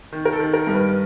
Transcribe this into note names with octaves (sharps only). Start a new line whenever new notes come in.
D#3
A#4
A4
D#3
A#4
G2
B4